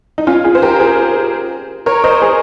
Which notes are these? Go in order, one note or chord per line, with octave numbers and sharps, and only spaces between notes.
D#4
C#4 F4
F4 G#4
C5
G4 A#4
G#4 C5
A#4 C#5
C5 D#5
G#4 C5